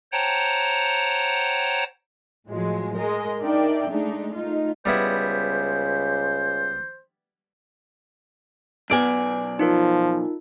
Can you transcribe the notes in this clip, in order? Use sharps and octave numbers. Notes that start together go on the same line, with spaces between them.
C5 C#5 F#5 G5 A5 A#5
A2 F3 F#3 G#3
G#3 A#4 D#5
D4 D#4 A#4 D5 E5 G5
G#3 A3 D4 D#4
A3 D#4 F4
C#2 G3 B3 E4 C5
B1 B3 D5 G#5 D7
F3 D#4 F4 A#4